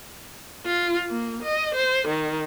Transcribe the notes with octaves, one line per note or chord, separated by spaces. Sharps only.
F4
A#3
D#5
C5
D#3